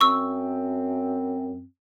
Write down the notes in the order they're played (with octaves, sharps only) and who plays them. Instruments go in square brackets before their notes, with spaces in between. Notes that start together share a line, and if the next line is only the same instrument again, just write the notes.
[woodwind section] F#2 C4 [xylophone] C#6 E6